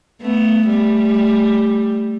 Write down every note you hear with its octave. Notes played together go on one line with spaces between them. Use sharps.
A3 B3
G3 A3